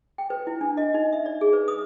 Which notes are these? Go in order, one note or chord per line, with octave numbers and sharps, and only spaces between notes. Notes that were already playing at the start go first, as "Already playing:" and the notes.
G5
B4
E4
D4
D#5
D#4
E5
D5
G#4
B4
D#6